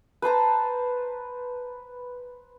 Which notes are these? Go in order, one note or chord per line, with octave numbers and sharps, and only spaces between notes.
B4 C5 A5 A#5